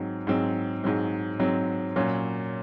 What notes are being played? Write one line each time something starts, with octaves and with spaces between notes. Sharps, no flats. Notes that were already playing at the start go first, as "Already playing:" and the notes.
Already playing: G#2 F#3 C4
G#2 F#3 C4
G#2 F#3 C4
G#2 F#3 C4
A#2 F#3 C#4